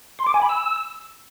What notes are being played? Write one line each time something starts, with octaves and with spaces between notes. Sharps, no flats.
C6
D6
G#5
B5
E6